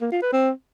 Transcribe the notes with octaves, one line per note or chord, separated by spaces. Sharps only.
A#3
F4
B4
C4